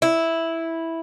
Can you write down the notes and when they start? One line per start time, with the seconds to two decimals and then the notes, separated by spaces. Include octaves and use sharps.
0.02 E4